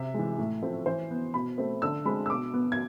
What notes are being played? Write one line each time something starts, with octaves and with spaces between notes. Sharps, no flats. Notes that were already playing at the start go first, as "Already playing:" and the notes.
Already playing: C3 E5
E3 G#3
A2
F3 A3 C4
E3 C5
B3
B2 B5
A3 C4
D3 E6
G#3 C4 B5
E6
B2 D6
B3
G#6